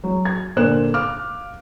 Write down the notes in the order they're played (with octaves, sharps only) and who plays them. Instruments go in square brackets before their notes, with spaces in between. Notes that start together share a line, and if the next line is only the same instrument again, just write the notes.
[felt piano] F#3
G#6
A#2 D3 A#4 C5 F#6 E7
F5 D6 F6